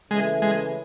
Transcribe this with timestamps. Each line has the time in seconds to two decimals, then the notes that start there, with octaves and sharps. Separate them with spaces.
0.11 C#3 E3 G#3 A3
0.42 G#3